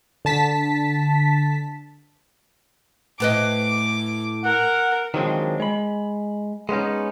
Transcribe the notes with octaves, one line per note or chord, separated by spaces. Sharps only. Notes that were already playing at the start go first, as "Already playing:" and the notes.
D3 A5 B6
A2 B4 D#5 D6
A#4 F#5
D#3 F3 F#3 G#3 C4 D4
G#3 B5
G#3 B3 C#4 D#4